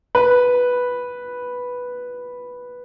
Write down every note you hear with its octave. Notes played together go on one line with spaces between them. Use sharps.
B4